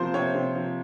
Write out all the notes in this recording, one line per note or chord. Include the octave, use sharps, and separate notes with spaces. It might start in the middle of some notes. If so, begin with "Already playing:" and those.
Already playing: C3 F3 A#3 C5
C3 C#5
C3
F3